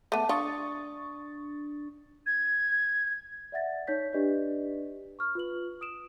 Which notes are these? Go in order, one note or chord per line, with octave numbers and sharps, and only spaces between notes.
A3 B3 A5 D6 D#7
D4 F4 C#6 D#6 A6
G#6
D5 E5 F#5 A6 A#6
D#4 C#5 G6 B6
D4 G4 B4 D5 D#5
C#6 F6
F4 B4 F#7
D#6 D7 E7